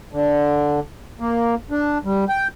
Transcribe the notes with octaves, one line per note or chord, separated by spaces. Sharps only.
D3
A#3
D4
G3
G5